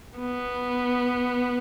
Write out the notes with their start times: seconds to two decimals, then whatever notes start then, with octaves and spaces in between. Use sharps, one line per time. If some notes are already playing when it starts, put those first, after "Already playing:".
0.19 B3